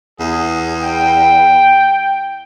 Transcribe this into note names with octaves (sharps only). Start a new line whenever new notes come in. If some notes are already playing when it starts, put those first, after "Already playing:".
E2 G#4
G5